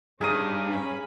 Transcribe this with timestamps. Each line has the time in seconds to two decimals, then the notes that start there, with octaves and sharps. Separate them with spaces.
0.21 G2 C#4 D#4 G4 G#4 A#4 D#6
0.68 C#4 B5